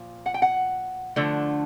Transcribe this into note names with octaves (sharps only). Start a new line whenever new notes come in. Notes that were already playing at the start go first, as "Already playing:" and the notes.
Already playing: A#2 F3
F#5
G5
F#5
D3 F3 A3 D4